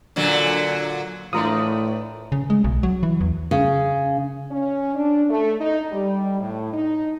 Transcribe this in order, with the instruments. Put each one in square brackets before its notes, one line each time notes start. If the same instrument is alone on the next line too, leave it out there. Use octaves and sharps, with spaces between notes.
[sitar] A#2 D3 F#3
[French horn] A2 [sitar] E3 A3 D4 [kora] F4 A#4 D5 [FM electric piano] D#6
[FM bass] C#3
G#3
B1
F#3
E3
E2
[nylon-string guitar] C#3
[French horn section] C#4
D4
A3
D#4
G3
A2
D#4